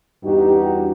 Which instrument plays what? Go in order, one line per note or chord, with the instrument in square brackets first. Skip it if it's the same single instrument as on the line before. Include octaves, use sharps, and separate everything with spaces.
[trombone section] E2 G2 F#4 [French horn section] D#4 G4